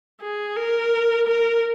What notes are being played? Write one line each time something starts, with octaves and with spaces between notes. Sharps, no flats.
G#4
A#4
A#4